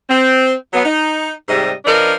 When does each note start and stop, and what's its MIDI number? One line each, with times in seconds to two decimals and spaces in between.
0.09 0.52 60
0.74 0.82 54
0.74 0.82 59
0.85 1.31 63
1.49 1.72 44
1.49 1.72 48
1.49 1.72 55
1.49 1.72 75
1.85 2.14 53
1.85 2.14 62
1.85 2.14 70
1.85 2.14 71
1.85 2.14 75